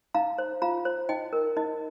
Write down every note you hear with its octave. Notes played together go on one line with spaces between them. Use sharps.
D#4 F5 A#5
C5
F4 F5 A#5
C5
D#4 D#5 G5
A#4
D#4 D#5